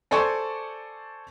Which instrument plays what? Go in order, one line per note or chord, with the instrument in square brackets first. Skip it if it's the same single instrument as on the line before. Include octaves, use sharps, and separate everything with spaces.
[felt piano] A4 C5 D5 G#5 C#6